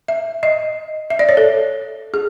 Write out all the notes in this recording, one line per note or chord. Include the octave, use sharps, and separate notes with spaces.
E5
D#5
E5
D5
C#5
A4
G#4